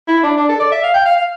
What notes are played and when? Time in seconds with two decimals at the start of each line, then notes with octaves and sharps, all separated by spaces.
0.08 E4
0.23 D4
0.37 D4
0.49 A4
0.60 D5
0.72 E5
0.83 F5
0.94 G5
1.05 F5
1.17 F5